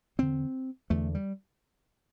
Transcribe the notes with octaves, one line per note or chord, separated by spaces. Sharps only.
E2 D3 C4
E2 D3 A3
G3